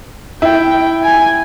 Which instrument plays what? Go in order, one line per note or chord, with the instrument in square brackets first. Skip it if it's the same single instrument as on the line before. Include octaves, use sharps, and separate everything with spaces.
[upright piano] E4 [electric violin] G5
[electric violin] G#5